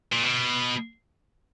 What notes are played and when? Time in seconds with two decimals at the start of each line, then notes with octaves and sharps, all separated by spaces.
0.12 A#2
0.23 B2